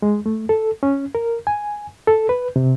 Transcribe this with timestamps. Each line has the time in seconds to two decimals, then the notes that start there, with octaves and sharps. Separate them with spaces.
0.02 G#3
0.26 A3
0.49 A4
0.83 C#4
1.15 A#4
1.47 G#5
2.07 A4
2.29 B4
2.56 C3